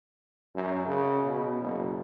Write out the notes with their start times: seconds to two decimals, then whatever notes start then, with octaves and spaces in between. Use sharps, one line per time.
0.55 F#2
0.87 C#3
1.25 B2
1.62 F#1